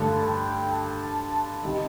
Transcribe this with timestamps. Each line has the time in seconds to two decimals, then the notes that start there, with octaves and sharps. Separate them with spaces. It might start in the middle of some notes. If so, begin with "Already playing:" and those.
Already playing: G2 D3 A3 A5
0.27 G5
0.72 A5
1.63 C3 D#3 G3